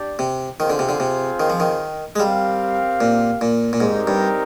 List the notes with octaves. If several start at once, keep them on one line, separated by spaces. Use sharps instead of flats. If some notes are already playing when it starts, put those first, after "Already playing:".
Already playing: D4 G4 D5
C3
D#3 C4 F4 G#4 C5 F5
D3
C3
D3
C3
D#3
F3
D#3
G#3
G3 C4 G4 A#4 F5
A#2
A#2
A#2
G#2 C4 D#4 G4 A#4 D5
G2